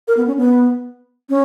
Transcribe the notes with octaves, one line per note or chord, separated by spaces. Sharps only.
A#4
B3
C#4
B3
C#4